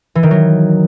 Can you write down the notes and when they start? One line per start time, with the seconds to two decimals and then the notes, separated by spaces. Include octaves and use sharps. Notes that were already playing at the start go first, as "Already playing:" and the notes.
0.15 E3
0.23 D#3
0.31 F#3